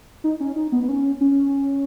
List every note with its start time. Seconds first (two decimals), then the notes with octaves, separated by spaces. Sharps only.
0.24 D#4
0.40 C#4
0.56 D#4
0.72 B3
0.83 B3
0.89 C#4
1.21 C#4